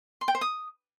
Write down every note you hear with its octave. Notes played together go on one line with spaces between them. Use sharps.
C6
G5
C5
D#6